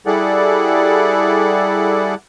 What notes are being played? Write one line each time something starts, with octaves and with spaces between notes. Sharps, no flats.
G3 E4 G#4 A4 D5 F#5